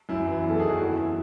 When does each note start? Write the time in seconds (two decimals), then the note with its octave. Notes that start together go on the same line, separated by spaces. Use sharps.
0.09 F#2 E4
0.27 E3
0.44 E2
0.50 A4
0.60 D#3 G#4
0.69 F#4
0.79 F#2 E4
0.96 E3 E4